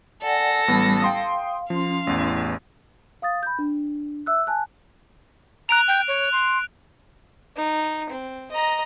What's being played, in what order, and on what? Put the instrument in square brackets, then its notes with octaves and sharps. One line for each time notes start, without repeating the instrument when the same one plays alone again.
[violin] A4 A#6 [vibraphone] D5 F#5 G#5
[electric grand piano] A1 B3 A5 [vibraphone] G3 B5
[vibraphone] F5 [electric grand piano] G5 C6 D#6
[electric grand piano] F3 [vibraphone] C#4 C6 [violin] F5
[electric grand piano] A1 E2
[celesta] F5 D#6 A6
B5 G6
D4
E5 E6 F#6
G#5 A5 F#6
[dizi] A#5 [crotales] F#6 D7 F7
[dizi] G5
C#5
C6
[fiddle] D#4
C4
D#5 A#5